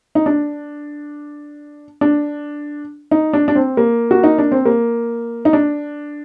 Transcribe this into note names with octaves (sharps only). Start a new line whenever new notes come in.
D#4
D4
D4
D#4
D4
D4
C4
A#3
F#4
D#4
D4
C4
A#3
D#4
D4